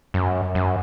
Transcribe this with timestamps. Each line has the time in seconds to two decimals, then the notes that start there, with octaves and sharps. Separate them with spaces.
0.14 F#2
0.55 F#2